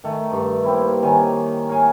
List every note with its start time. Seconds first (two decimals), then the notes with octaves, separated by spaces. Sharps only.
0.04 D#3 A3
0.31 G2
0.64 A#3 C4 E4
1.03 D#3 C#5 G#5
1.69 A#4 C#5 F5 G#5